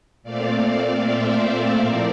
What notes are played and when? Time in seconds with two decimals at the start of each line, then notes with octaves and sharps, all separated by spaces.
0.23 A#2 A3 C4 D5 F5
1.01 C5 E5
1.79 A2 F3 C4 A#4 D5